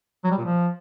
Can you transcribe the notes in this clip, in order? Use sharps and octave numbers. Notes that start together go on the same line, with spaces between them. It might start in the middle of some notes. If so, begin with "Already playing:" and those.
F#3
G3
A#2
F3